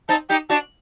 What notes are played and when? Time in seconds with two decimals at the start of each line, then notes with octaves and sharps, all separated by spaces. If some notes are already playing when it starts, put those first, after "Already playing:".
0.09 C4 D#4 A5
0.29 D#4 G4 G5
0.50 D4 F#4 A5